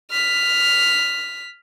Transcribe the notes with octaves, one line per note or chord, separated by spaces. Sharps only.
F6 B6